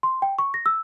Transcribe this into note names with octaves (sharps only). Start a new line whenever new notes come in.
C6
G5
C#6
A#6
E6